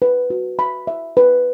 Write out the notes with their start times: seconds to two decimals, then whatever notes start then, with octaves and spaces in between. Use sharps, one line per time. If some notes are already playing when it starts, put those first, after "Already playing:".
0.02 B4
0.30 F#4
0.59 B5
0.87 E5
1.17 B4